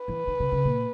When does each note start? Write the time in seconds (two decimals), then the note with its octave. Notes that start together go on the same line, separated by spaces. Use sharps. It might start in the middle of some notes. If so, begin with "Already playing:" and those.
Already playing: B4
0.08 E3
0.27 D#3
0.40 C#3
0.52 C#3
0.65 A#2